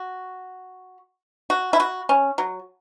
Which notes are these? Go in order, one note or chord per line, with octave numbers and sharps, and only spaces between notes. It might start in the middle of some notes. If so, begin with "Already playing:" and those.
Already playing: F#4
F#4
E4
F#4
C#4
F#3